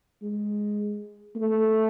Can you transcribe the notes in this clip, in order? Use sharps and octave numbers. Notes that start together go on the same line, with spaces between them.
G#3
A3